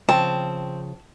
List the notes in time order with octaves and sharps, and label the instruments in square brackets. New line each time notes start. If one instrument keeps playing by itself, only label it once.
[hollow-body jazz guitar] C#3 F3 [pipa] C4 [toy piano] G5 [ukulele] A5